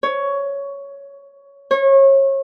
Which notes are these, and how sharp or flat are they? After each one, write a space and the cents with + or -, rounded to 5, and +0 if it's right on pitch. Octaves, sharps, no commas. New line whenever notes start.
C#5 +10
C#5 -30